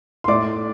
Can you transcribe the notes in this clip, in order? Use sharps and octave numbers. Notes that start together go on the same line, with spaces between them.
C6
A2 D5 D6